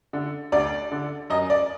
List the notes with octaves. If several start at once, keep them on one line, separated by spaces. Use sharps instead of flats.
D3
D2 D5
D3
F#2 D#5
D5